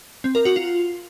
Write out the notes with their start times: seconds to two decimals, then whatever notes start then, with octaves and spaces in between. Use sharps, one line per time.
0.24 C4
0.35 A#4
0.45 F#4
0.56 F4